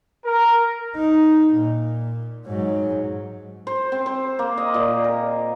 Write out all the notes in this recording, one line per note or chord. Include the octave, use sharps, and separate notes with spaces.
A#4
D#4
A#2
G#2 F#3
C5
C4
C5
A#3
D#5
A#2
A#4